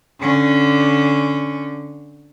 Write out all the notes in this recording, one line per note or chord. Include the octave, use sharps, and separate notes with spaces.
D3 C#4